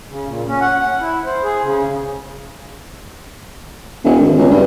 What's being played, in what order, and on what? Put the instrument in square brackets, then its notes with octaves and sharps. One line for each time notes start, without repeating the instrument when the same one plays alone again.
[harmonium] C#3
A#2
C#4
F#5
F#5
E4
C5
G#4
C#3
[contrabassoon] E1
G#1
C#2
G2